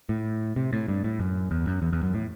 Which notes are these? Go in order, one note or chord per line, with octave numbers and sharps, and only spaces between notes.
A2
C3
A2
G2
A2
F#2
E2
F#2
E2
E2
F#2
A2